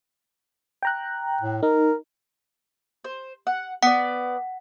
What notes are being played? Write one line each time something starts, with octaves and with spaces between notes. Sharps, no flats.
G5 A#5 F#6
A2
D#4 A#4
C5
F#5
B3 D5 F#5